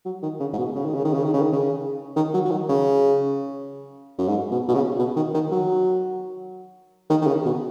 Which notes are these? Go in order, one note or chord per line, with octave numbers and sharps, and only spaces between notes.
F#3
D#3
C#3
G#2
B2
C#3
D#3
C#3
D#3
C#3
D#3
C#3
D#3
C#3
D#3
F#3
F#3
D#3
C#3
F#2
G#2
B2
B2
C#3
B2
D#3
D#3
F#3
D#3
D#3
C#3
B2